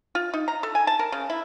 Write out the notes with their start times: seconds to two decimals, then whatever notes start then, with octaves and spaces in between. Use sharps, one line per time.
0.15 F4
0.34 D#4
0.48 A#5
0.63 A4
0.75 G#5
0.87 A5
0.99 A#4
1.12 C#3
1.30 E4